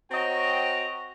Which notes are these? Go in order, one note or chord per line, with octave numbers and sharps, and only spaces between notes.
C4 F#4 C#5 D#5 G5 A#5